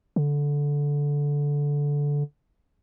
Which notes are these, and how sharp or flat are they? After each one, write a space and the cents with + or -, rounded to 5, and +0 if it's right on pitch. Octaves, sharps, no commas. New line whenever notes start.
D3 -15